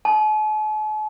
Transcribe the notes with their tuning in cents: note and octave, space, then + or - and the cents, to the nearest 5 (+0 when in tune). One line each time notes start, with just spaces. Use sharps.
A5 -45